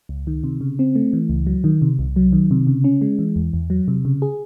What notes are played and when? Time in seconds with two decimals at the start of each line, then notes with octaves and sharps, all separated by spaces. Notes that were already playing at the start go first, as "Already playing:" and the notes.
0.09 C#2
0.27 D#3
0.44 C3
0.61 C#3
0.79 C4
0.95 A3
1.13 E3
1.29 C#2
1.47 F#3
1.64 D#3
1.82 C3
1.99 C2
2.16 F#3
2.33 D#3
2.51 C3
2.67 C#3
2.84 C#4
3.01 G#3
3.19 E3
3.36 E2
3.53 E2
3.70 F#3
3.88 C3
4.05 C#3
4.22 G#4